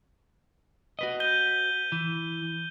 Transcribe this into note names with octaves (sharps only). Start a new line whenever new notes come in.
F#4 B4 D#5
G6 D#7 G7
E3